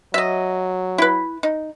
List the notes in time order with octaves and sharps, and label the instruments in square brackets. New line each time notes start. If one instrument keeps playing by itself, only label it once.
[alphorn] F#3 [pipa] D#5 E5
[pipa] E4 B4
D#4